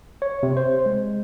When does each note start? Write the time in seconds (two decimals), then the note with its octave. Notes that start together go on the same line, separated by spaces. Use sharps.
0.22 C#5
0.43 C3
0.57 C5
0.86 G#3